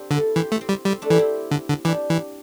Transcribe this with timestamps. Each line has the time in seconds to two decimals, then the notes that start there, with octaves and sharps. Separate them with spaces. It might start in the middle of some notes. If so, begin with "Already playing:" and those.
Already playing: C4 D4 G4
0.11 D3 E4 A4
0.36 E3 G4 C5
0.52 A3
0.61 C4
0.69 G3
0.85 G3 C4
1.02 A3 D4
1.10 E3 G4
1.19 C4 E4
1.51 D3
1.69 D3
1.85 E3 D4 G4
2.10 E3